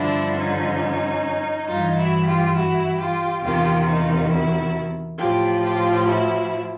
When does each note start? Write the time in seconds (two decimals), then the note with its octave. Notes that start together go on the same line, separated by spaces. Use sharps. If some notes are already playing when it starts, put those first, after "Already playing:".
Already playing: G2 D3 F3 D4 E4
0.36 C#4 D#4
1.67 G2 E3 D#4 F4
1.96 E4 F#4
2.26 F4 G4
2.55 E4 F#4
2.99 F4 G4
3.42 E2 C3 D#3 F4 G4
3.86 D#4 F4
4.30 E4 F#4
5.18 A2 F3 F4 G4
5.62 F4 G4
6.06 E4 F#4